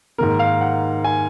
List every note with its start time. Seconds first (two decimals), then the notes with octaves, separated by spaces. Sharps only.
0.18 G#2 D#3 A#3 A#4
0.39 F5
0.61 F#5
1.04 G#5